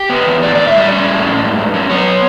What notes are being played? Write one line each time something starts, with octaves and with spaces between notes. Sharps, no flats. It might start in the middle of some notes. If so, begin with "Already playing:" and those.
Already playing: G4
B3
E2
A2 D5
A2 D5
E5
G3 D5
C#4
A2
A2
G2
G2
F#3
B3 C#5